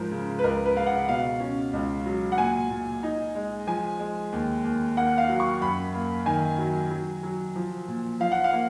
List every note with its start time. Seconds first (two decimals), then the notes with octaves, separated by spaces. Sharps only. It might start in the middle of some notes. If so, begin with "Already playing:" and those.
Already playing: G#2 F3 A#4
0.11 C#3
0.39 B4
0.44 C#2 A#4
0.65 B4
0.76 C#3 F5
0.87 F#5
1.09 B2 F5
1.40 C#4
1.73 C#2
2.06 F#3
2.32 F#5
2.38 A#2 G#5
2.70 A#2
3.03 D#4
3.35 G#3
3.67 F3 G#5
3.99 G#3
4.32 D#2
4.64 D#2
4.97 A#3 F#5
5.18 F5
5.29 F#3
5.40 C#6
5.61 F#2 B5
5.94 A#3
6.26 D#3 G#5
6.58 F#3
6.91 F#3
7.23 F#3
7.56 F3
7.88 A#2
8.20 F3 F5
8.32 F#5
8.44 F5
8.53 A#3